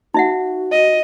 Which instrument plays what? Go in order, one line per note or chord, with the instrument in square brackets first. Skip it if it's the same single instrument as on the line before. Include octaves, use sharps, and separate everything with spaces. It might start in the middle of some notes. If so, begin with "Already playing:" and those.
[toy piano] D#4 E5 F#5 [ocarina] F#4
[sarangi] D#5